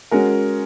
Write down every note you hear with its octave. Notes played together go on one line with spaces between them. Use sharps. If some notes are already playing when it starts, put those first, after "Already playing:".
G#3 C#4 F#4 A#4